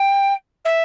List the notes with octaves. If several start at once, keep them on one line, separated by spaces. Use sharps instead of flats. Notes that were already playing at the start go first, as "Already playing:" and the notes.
Already playing: G5
E5